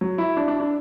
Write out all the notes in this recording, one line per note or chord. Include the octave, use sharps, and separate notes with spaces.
F#3
E4
D4
D4
D4